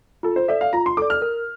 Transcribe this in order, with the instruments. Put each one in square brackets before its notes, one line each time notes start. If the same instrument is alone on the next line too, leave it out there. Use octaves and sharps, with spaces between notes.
[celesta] F4 [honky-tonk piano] A4
[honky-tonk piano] C5
[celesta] A4 D5 [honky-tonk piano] E5
[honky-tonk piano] F5
[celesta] F4 [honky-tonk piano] A#5
[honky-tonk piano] C6
[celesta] A4 D5 [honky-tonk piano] D6
[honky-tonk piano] F6
[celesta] A#4